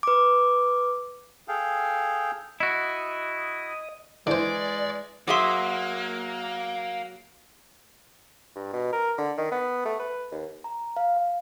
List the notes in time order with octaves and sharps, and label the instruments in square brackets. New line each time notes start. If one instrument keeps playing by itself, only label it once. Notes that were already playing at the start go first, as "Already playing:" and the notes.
[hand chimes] B4 D6
[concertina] G#4 A4 F5 G5
[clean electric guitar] E4 F#4 [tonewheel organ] D#5
[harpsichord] D3 C5 [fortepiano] E3 [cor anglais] G#3 [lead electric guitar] D5
[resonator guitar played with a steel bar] F#3 G#4 E5 [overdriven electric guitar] A#3 [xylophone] C6 D6
[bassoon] G2
B2
A#4
D3
D#3
B3
A3
B4
D#2
[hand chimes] A#5
F5
F5